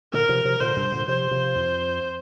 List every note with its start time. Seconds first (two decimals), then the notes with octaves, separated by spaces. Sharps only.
0.13 A#2 D3 A#4
0.29 C3 F3
0.45 C3 F3
0.60 A#2 D3 C5
0.76 G2 C3
0.92 A#2 D3
1.08 C3 F3 C5
1.31 C3 F3
1.55 F2